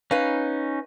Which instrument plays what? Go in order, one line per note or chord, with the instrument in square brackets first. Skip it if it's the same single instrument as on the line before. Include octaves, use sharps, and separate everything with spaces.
[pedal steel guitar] C#4 D#4 [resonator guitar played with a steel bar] B4 F5